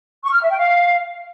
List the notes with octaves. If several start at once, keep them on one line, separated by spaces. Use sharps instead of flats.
C#6
F6
E5
G5
F5